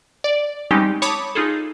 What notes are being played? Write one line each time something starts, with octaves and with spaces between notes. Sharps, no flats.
D5
G3 G#3 C4 C#4 D#4 G4
C#5 A5 B5 D6 D#6
D#4 F4 G#4 A4